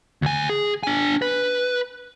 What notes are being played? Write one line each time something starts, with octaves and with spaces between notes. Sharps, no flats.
D2 G#5
G#4
D4 G#5
B4